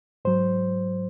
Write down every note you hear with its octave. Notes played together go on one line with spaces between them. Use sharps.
G#2 F#3 C5